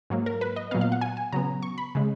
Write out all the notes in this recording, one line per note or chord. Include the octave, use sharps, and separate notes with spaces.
G#2 F#3 A#3
A#4
B4
D#5
A#2 F#3 B3 F5
F5
F#5
G#5
G#5
C#3 F#3 B3 A#5
C#6
B5
C#3 G#3